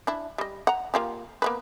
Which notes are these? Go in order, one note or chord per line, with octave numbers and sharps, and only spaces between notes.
D4 E4
G3 D#5
F#5 A#5
A#3 F4 G4
A#3 B3 B4